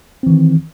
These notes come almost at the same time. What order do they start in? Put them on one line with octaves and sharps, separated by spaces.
C4 E3 D#3